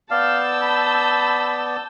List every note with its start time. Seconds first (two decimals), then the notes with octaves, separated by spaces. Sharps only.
0.11 B3 D5 F5 A5 E6 G6
0.62 B5